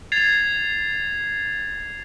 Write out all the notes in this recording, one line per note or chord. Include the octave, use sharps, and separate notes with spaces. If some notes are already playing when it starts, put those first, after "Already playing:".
G#6 A6 C7 F7